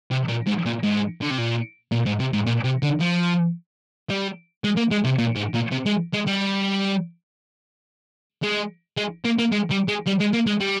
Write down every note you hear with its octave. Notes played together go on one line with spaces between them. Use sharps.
C3
A#2
G#2
A#2
G#2
D3
C3
A#2
A#2
G#2
C3
G#2
A#2
C3
D3
F3
G3
G#3
A#3
G#3
C3
A#2
G#2
A#2
C3
G#3
G#3
G3
G#3
G#3
A#3
A#3
G#3
G3
G#3
G3
G#3
A#3
G#3
G3